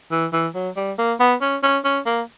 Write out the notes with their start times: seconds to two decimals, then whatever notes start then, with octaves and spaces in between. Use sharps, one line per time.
0.11 E3
0.33 E3
0.54 F#3
0.77 G3
0.98 A#3
1.20 B3
1.41 C#4
1.63 C#4
1.84 C#4
2.06 A#3